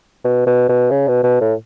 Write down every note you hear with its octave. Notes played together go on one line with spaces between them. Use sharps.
B2
B2
B2
C#3
B2
B2
A2